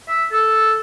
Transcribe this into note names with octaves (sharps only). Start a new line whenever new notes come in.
E5
A4